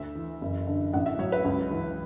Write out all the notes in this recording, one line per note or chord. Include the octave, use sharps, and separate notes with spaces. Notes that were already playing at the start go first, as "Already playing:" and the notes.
Already playing: D2 E5
E3
F#1
D3
A1 F#5
E5
F#3 C#5
B4
C#2
E3